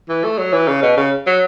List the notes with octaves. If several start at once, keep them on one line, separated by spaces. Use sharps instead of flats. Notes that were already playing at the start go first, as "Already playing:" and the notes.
E3
A3
F#3
E3
C#3
B2
C#3
F#3